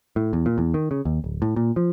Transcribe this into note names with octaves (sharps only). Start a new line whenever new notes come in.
A2
E2
A#2
E2
D#3
C#3
D#2
D1
A2
A#2
F3